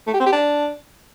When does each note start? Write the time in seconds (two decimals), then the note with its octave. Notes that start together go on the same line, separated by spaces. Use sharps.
0.07 A3
0.14 G4
0.20 C4
0.26 G4
0.32 D4